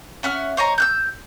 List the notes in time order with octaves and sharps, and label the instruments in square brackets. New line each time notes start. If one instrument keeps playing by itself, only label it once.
[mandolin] C#4 E5 F#5 F6
C5 C#5 D#5 A#5
E6 F#6 G6